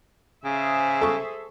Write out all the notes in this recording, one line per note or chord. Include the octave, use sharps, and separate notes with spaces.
C#3 G#4 C5 E5
A4 C#6